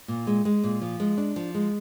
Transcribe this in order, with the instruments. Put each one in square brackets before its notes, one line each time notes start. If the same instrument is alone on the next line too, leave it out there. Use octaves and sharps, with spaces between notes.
[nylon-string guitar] A#2
G#3
G#3
A#2
F3
G#3
D4
F3
G#3